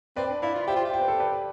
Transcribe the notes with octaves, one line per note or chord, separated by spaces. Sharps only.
C4 B4 D5
D4
E4 D5 F5
F4
G4 C5 E5
F4
G4
C5
B4
A4 C5
B4 D5